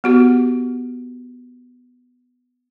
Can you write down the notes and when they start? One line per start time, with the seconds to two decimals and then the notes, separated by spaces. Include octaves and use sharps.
0.04 B3 F#4 G4